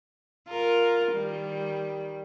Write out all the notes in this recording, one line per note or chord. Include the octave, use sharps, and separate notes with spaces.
F4 A#4
D#3 G3